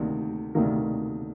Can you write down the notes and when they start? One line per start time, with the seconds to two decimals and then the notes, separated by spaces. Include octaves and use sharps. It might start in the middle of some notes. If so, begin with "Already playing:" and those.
Already playing: D2 C3 D#3 A#3
0.55 D2 C3 D#3 A#3